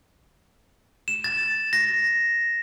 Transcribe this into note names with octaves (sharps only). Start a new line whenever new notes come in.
E7
A6
A#6